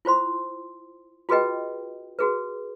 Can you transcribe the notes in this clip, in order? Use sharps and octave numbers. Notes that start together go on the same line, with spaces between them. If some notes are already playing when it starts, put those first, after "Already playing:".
E4 F4 C5 C6
F4 F#4 G#4 B4 D#5 G5
F#4 G#4 B4